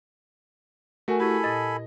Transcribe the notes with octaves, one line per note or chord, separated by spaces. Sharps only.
A3 F#4 A#4 G#5
E4 G4 A4 G#5 B5
A#2 D#5 A5 A6